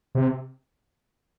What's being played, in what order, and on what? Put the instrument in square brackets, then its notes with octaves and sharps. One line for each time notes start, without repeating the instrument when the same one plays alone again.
[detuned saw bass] C3